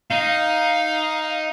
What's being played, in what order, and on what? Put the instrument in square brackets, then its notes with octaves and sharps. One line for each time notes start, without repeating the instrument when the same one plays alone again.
[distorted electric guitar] D#4 [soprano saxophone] F5